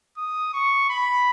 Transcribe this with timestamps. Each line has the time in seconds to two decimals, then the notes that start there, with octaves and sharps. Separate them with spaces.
0.17 D#6
0.53 C#6
0.90 B5